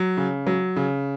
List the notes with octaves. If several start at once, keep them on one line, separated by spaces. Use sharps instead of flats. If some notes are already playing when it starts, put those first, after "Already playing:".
Already playing: F#3
C#3
F#3
C#3